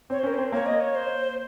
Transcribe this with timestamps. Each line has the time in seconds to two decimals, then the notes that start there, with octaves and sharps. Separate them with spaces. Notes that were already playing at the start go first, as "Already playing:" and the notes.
0.10 C4 C#5
0.18 C5
0.23 C#4 A#4
0.33 C5
0.38 C4
0.52 A#3 C#5
0.66 D#5
0.80 C#5
0.94 C5